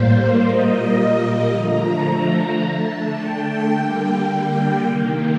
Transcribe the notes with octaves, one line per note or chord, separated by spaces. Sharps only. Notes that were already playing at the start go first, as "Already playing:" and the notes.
Already playing: A2 G3 A#3 C5
A#2 G3 A#3 D#5
D#5
D3 F3 A3 A#5
A#5
D3 A3 A5
G5
D3 G3 A#3 G5
C3 D#3 A#3